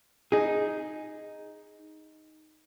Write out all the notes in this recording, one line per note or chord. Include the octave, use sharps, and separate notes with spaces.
D#4 G#4